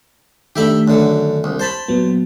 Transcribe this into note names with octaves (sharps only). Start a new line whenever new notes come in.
D#3 A3 D4 G4 E5 B5
F#2 D3
C2
C5 A5 B5
A#2 F#3 B3